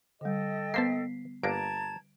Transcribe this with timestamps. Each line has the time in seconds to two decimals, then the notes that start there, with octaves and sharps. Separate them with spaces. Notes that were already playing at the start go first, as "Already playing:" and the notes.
0.21 D3 G3 A4 D#5 G5
0.74 A#3 B3 C5 A5 B6 C7
1.43 G1 A#3 D4 A5 A#5 G#6 D7